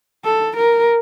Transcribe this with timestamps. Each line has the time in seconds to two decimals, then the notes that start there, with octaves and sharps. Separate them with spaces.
0.25 A4
0.57 A#4